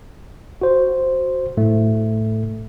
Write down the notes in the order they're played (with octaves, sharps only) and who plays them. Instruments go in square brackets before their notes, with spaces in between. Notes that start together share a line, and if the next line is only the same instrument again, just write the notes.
[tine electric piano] F#4 C5
A2 A3